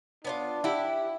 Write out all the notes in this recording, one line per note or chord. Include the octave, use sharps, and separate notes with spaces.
B3 C#4 D4 F4
E4 G4 F#5